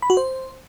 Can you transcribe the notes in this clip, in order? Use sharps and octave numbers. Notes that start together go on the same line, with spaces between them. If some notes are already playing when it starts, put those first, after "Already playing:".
B5
F#4
C5